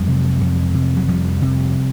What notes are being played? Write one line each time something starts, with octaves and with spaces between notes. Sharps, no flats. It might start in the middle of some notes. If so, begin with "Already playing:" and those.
Already playing: F2 F#3 G#3
C3
F2
C3
F#3
F2 F3 G3
C3